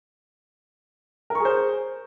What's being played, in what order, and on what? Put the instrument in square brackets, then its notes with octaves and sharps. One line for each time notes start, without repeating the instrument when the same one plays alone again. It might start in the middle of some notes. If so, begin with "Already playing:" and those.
[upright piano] A#4
C#6
G#4
C5